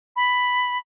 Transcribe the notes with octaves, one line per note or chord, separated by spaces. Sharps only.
B5